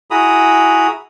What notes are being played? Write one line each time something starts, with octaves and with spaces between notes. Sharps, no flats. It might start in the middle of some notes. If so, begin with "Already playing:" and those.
E4 F#4 G#4 A#5 B5 D#6